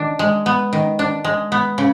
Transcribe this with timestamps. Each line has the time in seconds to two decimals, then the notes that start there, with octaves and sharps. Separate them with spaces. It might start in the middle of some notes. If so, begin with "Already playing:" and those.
Already playing: D#3 D4
0.19 G#3
0.46 B3
0.73 D#3
0.99 D4
1.24 G#3
1.52 B3
1.78 C#3